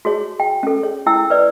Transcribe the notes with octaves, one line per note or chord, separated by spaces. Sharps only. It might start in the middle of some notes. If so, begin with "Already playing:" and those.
F#4 G#4 C#5
G5
C#4 A4
G#4 C#5
E4 G5 E6
B4 D5